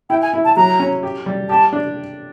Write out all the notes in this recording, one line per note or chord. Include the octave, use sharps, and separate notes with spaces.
E4 G5
G#5
E4
A5
F#3 A#5
C#4
G4
G3
G4 A5
D4